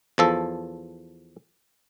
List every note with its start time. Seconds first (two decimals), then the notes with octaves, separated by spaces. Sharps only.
0.18 E2 F3 A4